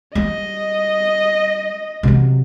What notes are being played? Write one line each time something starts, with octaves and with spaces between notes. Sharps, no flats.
G3 D#5
C3 F#3